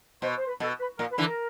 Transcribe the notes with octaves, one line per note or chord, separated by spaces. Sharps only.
B2 C5
C5
B4
B2 A4
B4
A#2 A#4
B4
D3 E3
A#4